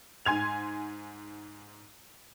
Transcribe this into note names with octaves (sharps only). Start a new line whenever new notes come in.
G#2 G#5 C6 G#6 F7